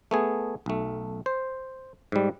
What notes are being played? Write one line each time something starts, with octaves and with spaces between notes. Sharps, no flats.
A3 B3 G#4
B1 A3
C5
G#2 G3